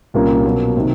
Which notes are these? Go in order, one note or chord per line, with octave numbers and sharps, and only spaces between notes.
C2 A#2 G3 A#3 C#4
B2 F#3 A#3
C3 D#3